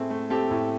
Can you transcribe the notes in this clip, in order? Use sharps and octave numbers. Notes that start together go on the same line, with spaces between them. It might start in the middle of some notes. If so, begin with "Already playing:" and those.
Already playing: A2 A3 C4 G#4
A3
C4 G4 A4
A2